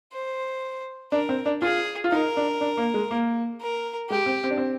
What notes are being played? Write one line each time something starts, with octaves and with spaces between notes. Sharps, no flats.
C5
D4 A#4
C4
D4
F4 G#4
F4
D#4 A#4
D4
D4
A#3
G#3
A#3
A#4
G#3 G4
C4
C4
D4
C4